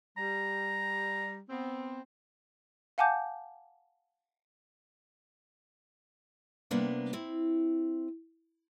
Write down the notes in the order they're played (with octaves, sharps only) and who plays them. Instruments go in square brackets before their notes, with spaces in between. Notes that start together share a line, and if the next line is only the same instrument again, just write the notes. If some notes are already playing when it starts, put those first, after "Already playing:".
[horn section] G3 [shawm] A#5
[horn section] B3 C4
[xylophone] F5 F#5 G#5 A5 D6 G6
[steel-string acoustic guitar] C3 G3 A#3 B3 D4
C4 E4